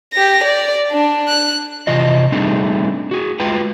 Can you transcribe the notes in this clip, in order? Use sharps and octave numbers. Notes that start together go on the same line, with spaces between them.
G4 A#6
D5
D4
F#6
C3 E3 F4 D#5
G3 A3 C4 D4 D#4 G#4
F#4 G#4
G#3 F4 B4 G5